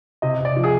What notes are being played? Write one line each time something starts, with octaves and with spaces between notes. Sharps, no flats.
C3 D#5
C3
D5
F3
G#4